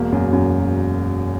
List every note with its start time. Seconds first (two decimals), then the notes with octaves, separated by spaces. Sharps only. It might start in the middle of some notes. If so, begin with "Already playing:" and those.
Already playing: E1 A#3
0.12 F#2
0.33 F#2